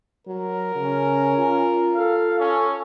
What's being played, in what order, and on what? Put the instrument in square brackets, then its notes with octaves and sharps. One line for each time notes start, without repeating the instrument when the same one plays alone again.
[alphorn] F#3 [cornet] A#4
[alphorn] C#3 [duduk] C#4
[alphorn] F4
[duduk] A4 [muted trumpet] F5
[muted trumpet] C#4